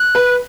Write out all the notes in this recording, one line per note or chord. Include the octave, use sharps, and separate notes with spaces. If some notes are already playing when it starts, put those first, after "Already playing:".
Already playing: F#6
B4